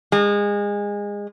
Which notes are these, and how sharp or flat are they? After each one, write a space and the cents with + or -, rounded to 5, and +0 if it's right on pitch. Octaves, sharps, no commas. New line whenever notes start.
G#3 -25